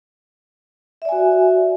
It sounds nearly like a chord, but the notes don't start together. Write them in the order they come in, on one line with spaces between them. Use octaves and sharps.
E5 D5 G#5 F#4